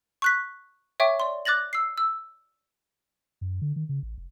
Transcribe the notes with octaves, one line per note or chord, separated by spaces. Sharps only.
C#6 F#6 B6
C#5 E5 G5 C#6 D6
D5 C6
D6 F#6 A6 A#6 F#7
E6 C7
E6
F#2
D3
D#3
C#3
A1
F1